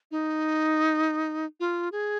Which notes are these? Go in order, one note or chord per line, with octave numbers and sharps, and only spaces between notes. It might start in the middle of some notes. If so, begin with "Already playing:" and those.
D#4
F4
G#4